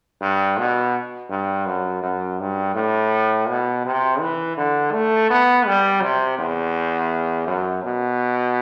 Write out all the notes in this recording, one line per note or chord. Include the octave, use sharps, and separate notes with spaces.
G2
B2
G2
F#2
F#2
G2
A2
B2
C3
E3
D3
A3
B3
G3
C3
E2
F#2
B2